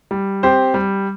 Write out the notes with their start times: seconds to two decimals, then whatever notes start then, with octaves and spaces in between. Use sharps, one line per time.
0.11 G3
0.43 C4 G4 C5
0.74 G3